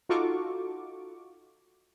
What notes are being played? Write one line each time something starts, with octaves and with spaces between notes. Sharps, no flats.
D#4 F4 F#4 A4 C#6 D6